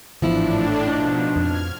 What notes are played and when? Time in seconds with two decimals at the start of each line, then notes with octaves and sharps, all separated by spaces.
0.22 G#1 A2 E3 F3 B3 D4 E4
0.87 B2 F3 D4 D#4
1.36 F2 F6 G#6